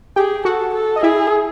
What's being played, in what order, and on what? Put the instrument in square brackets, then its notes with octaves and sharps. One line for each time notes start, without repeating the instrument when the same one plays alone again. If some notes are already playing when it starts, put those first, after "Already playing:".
[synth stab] G4 G5 [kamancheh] G#4
[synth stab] F#4 F#5 [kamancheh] A4
[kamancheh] A4
[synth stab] D#5
[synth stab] E4 E5 [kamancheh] G#4